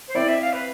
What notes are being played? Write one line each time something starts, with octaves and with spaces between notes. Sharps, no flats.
C5
C4 E4 D5
E5
F5
B4